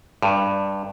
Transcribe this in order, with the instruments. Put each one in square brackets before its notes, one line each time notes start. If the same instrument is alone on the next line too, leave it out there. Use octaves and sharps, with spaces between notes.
[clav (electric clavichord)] G2